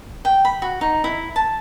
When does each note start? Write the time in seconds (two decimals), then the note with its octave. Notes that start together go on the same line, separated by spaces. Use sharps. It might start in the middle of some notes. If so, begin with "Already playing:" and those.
0.25 G5
0.45 B5
0.62 F#4
0.81 D#4
1.04 E4
1.36 A5